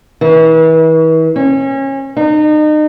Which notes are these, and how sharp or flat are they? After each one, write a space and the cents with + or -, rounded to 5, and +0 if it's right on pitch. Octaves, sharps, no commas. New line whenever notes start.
E3 -40
C#4 -30
D#4 -35